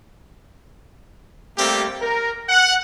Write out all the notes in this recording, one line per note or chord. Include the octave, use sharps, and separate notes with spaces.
G3 A3 A#3 C4 G4
A#4
F#5